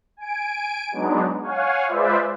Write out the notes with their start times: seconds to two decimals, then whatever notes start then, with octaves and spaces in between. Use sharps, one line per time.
0.17 G#5 D7
0.91 F#3 G#3 B3 D4 D#4
1.42 C#5 F5 F#5 G#5
1.85 G#3 F4 B4 C5 D5 E5